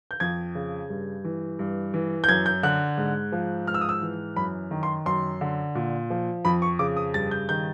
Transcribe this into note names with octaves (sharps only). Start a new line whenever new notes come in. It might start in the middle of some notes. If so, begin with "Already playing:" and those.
G6
F2 G#6
C#3
G2
E3
G2
E3
G6
F#2 G#6
G6
D3 F#6
G#2
F3
G#2 F6
E6
D#6
E6
E3
F#2 B5
D#3
C6
F#2 C6
D3
A#2
F3
F2 B5
C#6
C#3 D6
D#6
G2 A6
G6
D#3 G6